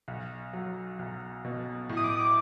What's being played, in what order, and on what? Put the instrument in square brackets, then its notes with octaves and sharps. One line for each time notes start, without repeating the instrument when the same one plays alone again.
[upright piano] B1
F#3
B1
B2
A2
[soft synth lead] D#6
D6
D#6
D6